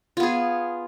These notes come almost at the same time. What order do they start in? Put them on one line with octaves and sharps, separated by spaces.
F4 B3 G#4